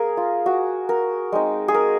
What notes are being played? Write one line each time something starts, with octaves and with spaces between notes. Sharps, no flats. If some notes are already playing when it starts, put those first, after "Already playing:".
Already playing: A#3 G#4 A#4
F4
F#4
A#4
G#3 C4 D#4
G#4
A#4